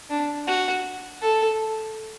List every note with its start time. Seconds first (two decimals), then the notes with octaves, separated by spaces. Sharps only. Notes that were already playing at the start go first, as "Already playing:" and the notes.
0.10 D4
0.47 F#4
1.22 A4